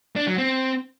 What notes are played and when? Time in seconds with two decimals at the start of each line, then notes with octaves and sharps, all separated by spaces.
0.16 D4
0.27 F#3
0.38 C4